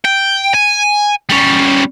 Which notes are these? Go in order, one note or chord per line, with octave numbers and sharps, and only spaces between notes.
G5
G#5
G3 C#4